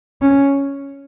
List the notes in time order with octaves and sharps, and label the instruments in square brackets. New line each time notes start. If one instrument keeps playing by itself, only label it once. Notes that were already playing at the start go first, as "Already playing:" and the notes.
[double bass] C#4